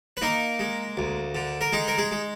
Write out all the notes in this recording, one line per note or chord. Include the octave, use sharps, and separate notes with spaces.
B4
A#3 D#4 A#4
G#3
D2
D3
A#4
G#3 D#4 G#4
A#4
G#3 G#4
G#3